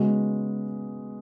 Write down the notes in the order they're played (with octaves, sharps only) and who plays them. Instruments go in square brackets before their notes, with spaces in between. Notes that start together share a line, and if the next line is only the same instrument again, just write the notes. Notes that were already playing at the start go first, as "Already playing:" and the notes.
Already playing: [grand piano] C#3 G#3 B3 F#4